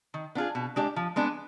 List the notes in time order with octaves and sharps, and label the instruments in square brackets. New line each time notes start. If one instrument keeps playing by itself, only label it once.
[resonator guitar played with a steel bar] D#3
B3 D4 F4 G#4
B2
G#3 D4 G4 D5
F3
G#3 B3 D4